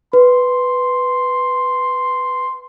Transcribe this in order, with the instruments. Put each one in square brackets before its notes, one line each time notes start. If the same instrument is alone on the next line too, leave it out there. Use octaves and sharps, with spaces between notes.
[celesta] B4 [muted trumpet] C6